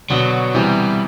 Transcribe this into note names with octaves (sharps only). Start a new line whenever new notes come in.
B2 D3 F#3
C3 E3 G3